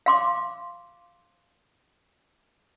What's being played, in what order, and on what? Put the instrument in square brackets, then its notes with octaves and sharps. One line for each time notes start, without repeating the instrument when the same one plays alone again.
[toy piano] F5 C6 D6